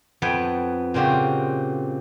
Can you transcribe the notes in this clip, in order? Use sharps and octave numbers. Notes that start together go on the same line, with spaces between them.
F2 B3 A4 B4 G5 G#5
A#2 C#3 C4 F#4 G4